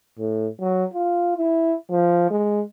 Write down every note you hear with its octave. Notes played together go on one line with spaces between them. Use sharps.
A2
F#3
F4
E4
F3
G#3